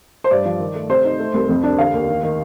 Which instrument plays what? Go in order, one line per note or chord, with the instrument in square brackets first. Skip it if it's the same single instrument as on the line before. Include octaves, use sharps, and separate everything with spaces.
[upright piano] C5
G2 D5
F3
D#3
A3
C3 C5
D#4
A3
C2
F2
D4
D3 F5
D#2
D#3
D#3